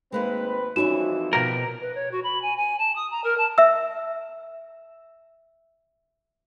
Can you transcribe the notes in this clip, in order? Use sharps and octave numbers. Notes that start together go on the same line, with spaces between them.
G#1 G#3 A#3 C4 D#4 B4
F2 E3 G3 C#4 D#4 E4 F#4 E7
B2 F3 G4 A#4
B4
C#5
F#4
B5
G#5
G#5
A5
D#6
A#5
A#4
A5
E5 E6